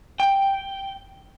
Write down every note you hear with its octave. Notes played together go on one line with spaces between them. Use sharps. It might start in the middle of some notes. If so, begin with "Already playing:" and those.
G5